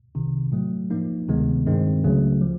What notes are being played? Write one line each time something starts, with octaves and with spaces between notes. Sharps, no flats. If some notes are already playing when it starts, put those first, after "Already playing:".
C2 C3 D#3
A2 F#3 A3
F3 A#3 D#4
D2 C3 D#3 G#3 B3
G2 D#3 G#3 C4
C#2 C#3 F#3 A3
F3